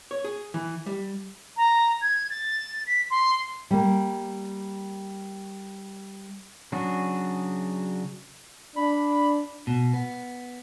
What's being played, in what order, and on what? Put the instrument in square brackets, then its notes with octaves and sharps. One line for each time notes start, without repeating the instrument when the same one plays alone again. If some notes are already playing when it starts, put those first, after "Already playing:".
[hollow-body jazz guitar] C#5
G#4
E3
G3
[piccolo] A#5
G#6
A6
B6
C6
[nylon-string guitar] G3 A#3
[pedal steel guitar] C#3 F#3 D4 F#4 G#4
[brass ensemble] D4 [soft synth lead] B5
[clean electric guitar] B2
B3